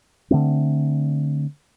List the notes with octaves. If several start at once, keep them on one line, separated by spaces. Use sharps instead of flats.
D3 F#3 A3 C4